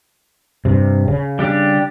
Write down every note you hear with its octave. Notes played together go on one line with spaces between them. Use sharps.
G2 C3
C#3
G3 D4 G4